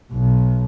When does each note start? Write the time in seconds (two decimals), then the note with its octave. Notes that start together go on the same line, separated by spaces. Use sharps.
0.13 B1